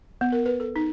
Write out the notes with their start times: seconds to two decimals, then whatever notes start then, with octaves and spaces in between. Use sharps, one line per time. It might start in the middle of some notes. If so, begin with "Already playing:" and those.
0.21 B3
0.32 A#4
0.46 B4
0.60 A4
0.76 D#4